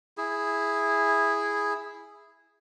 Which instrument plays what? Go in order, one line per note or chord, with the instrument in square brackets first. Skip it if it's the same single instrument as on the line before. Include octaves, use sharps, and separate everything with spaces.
[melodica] E4 G#4